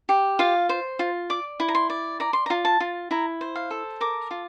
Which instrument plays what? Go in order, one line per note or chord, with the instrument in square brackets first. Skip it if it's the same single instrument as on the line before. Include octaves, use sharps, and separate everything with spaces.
[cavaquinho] G4
F4 F5
C5
F4
D5 D6
E4
A#5
C6
D5
D5 A#5
C6
A#5
F4
A5
F4
E4 A#5
C5
F5
A4
A#4 D6
F4